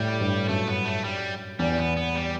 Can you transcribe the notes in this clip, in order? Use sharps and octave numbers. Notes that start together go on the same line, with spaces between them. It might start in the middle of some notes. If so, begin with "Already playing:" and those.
Already playing: A2 G3
G2
F#2 A3
B3
A3
G3
E2 G3
B3
B3
G3